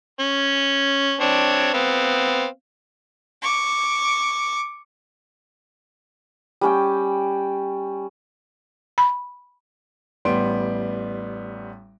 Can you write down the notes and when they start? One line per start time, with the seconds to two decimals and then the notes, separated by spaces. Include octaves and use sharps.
0.20 C#4
1.21 C4 D4 C#5
1.74 B3 C4 F5
3.43 C#6 D6
6.61 G3 C#4 G5
8.98 B5
10.25 A1 G3 B3 C6 D7